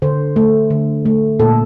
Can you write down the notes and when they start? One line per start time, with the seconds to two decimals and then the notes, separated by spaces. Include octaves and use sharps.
0.02 D3 C5
0.36 A3
0.70 D3
1.06 A3
1.39 A#2 A4